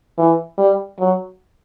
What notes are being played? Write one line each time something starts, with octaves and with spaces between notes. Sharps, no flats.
E3
G3
F#3